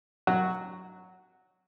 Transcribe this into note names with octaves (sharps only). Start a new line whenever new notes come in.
F#3 F#4